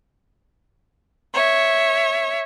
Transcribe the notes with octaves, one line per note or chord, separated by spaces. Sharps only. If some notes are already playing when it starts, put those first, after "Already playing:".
C#5 E5